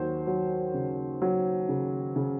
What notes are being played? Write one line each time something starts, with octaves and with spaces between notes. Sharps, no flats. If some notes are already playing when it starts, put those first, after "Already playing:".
Already playing: D#2 F#3 C5
F#3
C#3
F#3
C#3
C#3